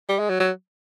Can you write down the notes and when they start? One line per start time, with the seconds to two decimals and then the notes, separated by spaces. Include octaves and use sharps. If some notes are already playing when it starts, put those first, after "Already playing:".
0.09 G3
0.19 G#3
0.30 F#3
0.40 F#3